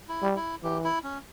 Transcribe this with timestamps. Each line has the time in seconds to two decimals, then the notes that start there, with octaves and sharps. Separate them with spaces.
0.09 E4
0.22 G3
0.36 E4
0.63 E3 G4
0.84 E4
1.04 C#4